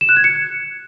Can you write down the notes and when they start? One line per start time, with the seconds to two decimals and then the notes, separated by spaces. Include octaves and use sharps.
0.01 E7
0.09 F#6
0.16 G#6
0.24 C#7